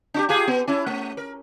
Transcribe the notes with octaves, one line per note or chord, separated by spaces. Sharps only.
D4 F#4 G4
F4 G4 G#4
B3
C#4 E4
A3
A#4